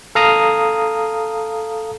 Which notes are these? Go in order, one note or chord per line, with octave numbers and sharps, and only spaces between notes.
A4 F5 A#5 D#6